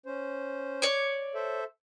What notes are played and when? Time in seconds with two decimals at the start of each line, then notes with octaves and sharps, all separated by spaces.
0.06 C#4 C5
0.82 C#5 D5
1.35 A4 C5 E5